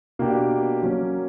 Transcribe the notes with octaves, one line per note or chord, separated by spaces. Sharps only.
B2 A#3 D4 G4
F#3 A#3 C#4